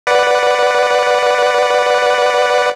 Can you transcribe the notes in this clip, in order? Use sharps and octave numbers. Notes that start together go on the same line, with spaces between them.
B4 D5 F#5